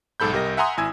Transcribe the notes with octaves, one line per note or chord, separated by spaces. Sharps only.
B1 G#2 A4 B5 G6
C2 G4 A#4 D#5 A#6
E5 F#5 G#5 A#5 C6 D#6
G#1 E4 G#5 E6 G#6